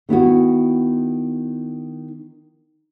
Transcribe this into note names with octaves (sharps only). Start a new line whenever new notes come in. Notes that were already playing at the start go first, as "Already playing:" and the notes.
D#3 B3 E4 F#4